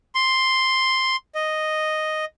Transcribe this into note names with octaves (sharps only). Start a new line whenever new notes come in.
C6
D#5